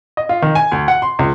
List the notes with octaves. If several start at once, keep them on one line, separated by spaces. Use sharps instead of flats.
D#5
F4
D#3
G#5
D2
F#5
C6
C#2